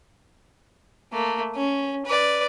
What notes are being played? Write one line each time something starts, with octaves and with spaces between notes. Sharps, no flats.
A3 A#3
C#4
B4 D5